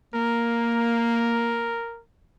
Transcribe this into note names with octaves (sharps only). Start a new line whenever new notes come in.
A#3 A#4